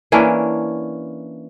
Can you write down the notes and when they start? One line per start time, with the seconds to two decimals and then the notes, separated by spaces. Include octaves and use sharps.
0.12 E3 A#3 C#4 D4